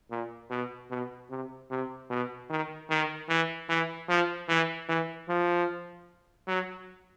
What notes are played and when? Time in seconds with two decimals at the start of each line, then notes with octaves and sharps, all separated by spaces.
0.11 A#2
0.51 B2
0.91 B2
1.30 C3
1.70 C3
2.10 B2
2.50 D#3
2.90 D#3
3.29 E3
3.69 E3
4.09 F3
4.49 E3
4.88 E3
5.28 F3
6.47 F#3